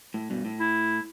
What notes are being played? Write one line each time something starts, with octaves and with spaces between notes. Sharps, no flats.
A2
G2 B2
A2
E4